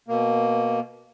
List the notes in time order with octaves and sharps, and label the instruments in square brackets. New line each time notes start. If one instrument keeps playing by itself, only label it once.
[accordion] B2 A#3